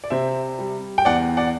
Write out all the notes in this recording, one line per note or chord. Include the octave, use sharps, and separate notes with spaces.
D5
C3 C5 E5
G3
G5
E2 D5 F#5
D5 F#5